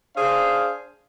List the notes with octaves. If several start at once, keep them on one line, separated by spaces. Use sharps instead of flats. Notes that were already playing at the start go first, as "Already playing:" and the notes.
D4 G#4 C5 F5